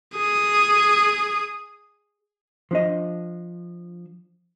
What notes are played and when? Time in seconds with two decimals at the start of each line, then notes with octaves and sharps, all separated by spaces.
0.17 G#4 D#6
2.71 F3 D4 D#5